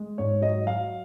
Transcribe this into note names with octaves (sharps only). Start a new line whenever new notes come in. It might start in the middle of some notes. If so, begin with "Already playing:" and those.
Already playing: G#3
G#2 C#5
F#3 D#5
F#3 F5